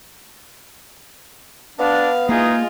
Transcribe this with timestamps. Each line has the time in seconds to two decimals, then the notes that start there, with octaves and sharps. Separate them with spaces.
1.79 B3 D4 F5
2.29 E3 G#3 A#3 D#4 F4 G#4